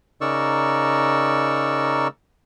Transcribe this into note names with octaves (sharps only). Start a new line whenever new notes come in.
C#3 D#4 A#4 D5 C#6 E6